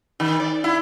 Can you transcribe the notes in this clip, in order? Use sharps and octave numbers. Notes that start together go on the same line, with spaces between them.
D#3
D5
E4